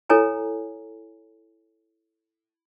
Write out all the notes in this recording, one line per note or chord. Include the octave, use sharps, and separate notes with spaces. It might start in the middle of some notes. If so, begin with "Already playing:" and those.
E4 A4 C#5 G#5 A#5